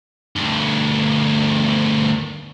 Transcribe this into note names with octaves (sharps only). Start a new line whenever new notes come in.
D2 G2